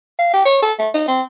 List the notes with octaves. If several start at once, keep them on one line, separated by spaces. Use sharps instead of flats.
F5
G4
C#5
A4
A3
D#4
C4